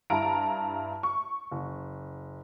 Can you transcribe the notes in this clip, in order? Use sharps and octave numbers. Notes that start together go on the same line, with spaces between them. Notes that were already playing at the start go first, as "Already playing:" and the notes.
G2 E4 F5 A5 A#5 D7
C#6
F#1